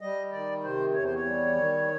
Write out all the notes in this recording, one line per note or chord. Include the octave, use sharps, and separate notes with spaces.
G3 D#5
D#3 D5
C3 C5
E2 C#5
C5
C#5
G3
D#3